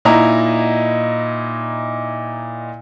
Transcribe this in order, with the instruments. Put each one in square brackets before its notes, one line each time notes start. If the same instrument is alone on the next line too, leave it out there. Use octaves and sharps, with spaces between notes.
[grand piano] A#2 D#4 E4 A#5